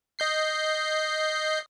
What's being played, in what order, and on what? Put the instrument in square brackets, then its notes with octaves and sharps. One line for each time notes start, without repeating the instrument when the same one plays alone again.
[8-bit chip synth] D#5 G6 C7